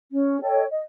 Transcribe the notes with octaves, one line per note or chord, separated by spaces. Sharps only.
C#4
A4 C#5 D#5 G5
D#5